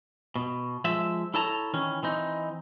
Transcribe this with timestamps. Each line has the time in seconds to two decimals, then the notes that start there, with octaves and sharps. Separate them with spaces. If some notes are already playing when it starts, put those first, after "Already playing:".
0.36 B2
0.84 F3 G#3 E5
1.34 E4 A4 C#5 A5 A#5
1.74 D#3 E3 C#4
2.03 E3 C4 D#4